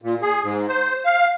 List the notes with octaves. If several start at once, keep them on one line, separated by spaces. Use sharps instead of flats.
A#2
G#4
G#2
C5
F5